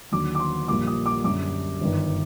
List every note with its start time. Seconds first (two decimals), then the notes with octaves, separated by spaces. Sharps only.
0.12 D#2 D3 F#3 D6
0.35 D6
0.40 C6
0.68 A#1 A#2 G3 A#3 D6
0.87 D#6
1.06 D6
1.24 F#2 D3 G3 D6
1.81 G1 G2 D#3